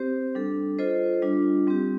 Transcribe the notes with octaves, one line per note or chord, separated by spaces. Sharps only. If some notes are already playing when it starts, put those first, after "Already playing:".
Already playing: C4 G4 C5
G3 D4 A4
F4 A4 C5 D#5
G3 D4 F4
G3 C4 G4